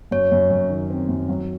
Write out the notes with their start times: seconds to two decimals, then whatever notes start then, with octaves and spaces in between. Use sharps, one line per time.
0.11 F#2 C#5
0.32 F#2
0.51 F#2
0.70 D#3
0.90 C4
1.09 F#2
1.29 F#3